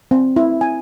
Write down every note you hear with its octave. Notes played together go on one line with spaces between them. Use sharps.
C4
E4
G#5